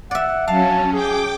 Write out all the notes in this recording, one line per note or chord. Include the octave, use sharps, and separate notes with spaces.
D5 E5 F#5
F#3 C#4 F5 A5
G#4 G5 D6